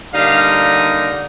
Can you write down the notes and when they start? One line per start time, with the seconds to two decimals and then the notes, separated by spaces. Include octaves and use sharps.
0.13 D3 G3 A#3 D#4 F5